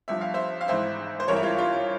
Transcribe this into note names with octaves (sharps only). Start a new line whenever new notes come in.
G1 G2 F3 E5
F5
C5 E5
F5
G#1 G#2 E3 C5 E5
C5
G#1 G2 E3 A#4 C#5
E4
F4
F4